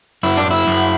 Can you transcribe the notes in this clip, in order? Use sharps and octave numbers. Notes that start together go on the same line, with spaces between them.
F#2 E4
D4
E4
F#2